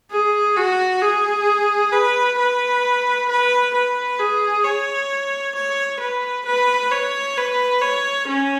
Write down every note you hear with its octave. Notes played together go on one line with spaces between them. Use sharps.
G#4
F#4
G#4
B4
B4
B4
B4
G#4
C#5
C#5
B4
B4
C#5
B4
C#5
C#4